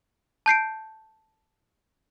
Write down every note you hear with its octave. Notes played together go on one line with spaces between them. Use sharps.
A5 G6 C7 D7